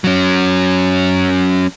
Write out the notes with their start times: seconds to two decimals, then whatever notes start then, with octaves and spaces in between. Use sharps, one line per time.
0.04 F#3 C#4